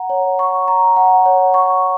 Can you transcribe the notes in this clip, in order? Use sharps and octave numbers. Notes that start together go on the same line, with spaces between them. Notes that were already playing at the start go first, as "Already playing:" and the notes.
Already playing: F#5 A#5
C#5
C#6
A#5
F#5
C#5
C#6